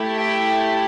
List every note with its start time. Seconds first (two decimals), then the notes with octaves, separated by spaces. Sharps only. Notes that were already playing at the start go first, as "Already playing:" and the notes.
Already playing: A3 E4 G4
0.18 E5 G5